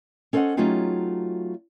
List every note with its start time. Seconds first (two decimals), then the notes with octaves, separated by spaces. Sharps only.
0.33 C#4 A4 C5 D5 D#5 F#5
0.57 F#3 A3 C#4 D#4 F4 G4